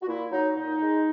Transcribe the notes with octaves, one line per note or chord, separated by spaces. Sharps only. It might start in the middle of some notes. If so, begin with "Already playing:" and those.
F#4
A#2 E4
F#3 D#4
A#2 D#4
G#3